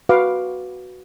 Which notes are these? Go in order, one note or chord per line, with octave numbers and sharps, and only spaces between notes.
F#4 B4 F5 D6